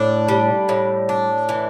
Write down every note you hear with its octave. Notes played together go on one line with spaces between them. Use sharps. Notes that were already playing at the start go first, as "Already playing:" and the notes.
Already playing: A2 D4
G3
A2
D4
E3